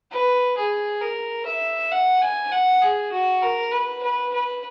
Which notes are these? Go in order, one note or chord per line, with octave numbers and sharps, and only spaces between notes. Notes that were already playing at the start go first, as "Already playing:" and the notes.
B4
G#4
A#4
E5
F#5
G#5
F#5
G#4
F#4
A#4
B4
B4
B4